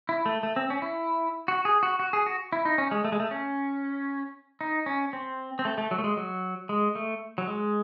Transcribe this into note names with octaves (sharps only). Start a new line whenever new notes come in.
E4
A3
A3
C4
C#4
E4
F#4
G#4
F#4
F#4
G#4
F#4
E4
D#4
C#4
G#3
A3
G#3
A3
C#4
D#4
C#4
C4
C4
A3
A3
F#3
A3
G#3
F#3
G#3
A3
F#3
G#3